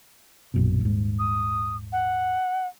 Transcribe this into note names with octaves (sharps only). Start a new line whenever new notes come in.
A#1 F#2 B2
D#1 G#2
D#6
F#5